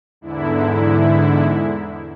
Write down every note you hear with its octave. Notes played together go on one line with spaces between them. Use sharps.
E2 G#2 D3 E4